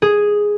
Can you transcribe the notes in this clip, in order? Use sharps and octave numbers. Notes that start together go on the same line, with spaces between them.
G#4